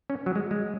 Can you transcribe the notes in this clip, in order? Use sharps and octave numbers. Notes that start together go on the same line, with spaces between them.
C#4
F#3
G#3
G#3